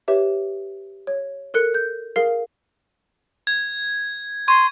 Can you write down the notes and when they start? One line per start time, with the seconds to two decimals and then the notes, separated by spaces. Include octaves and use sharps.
0.08 G4 B4 C#5 E5
1.07 C#5
1.54 A4 A#4 F#6 C#7
1.74 G6
2.16 G#4 A#4 F5 C7
3.47 G#6
4.48 C6 C#6 G#6